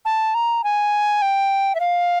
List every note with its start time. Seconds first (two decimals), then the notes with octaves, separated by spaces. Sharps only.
0.05 A5
0.34 A#5
0.64 G#5
1.22 G5
1.75 E5
1.80 F5